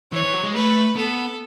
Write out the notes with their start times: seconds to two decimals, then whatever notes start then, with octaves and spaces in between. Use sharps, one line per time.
0.12 E3 C#5
0.23 E3
0.33 F#3
0.43 G#3
0.54 A3 B4
0.95 B3 A4